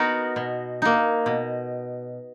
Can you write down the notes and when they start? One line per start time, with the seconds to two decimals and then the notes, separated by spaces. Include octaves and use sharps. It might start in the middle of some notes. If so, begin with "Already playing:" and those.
Already playing: B3 D#4 F#4 A#4
0.36 B2
0.82 A#3 D#4
1.26 B2